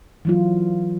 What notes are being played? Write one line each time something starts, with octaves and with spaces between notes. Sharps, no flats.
E3 F#3 F4